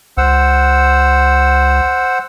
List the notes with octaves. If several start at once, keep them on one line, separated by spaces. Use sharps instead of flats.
C#2 C5 F#5 E6